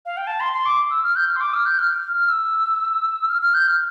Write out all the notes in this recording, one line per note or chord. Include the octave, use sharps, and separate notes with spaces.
F5
G5
A5
C6
C6
D6
E6
F6
G6
F6
C6
D6
F6
G6
F6
F6
E6
F6
F6
G6
F6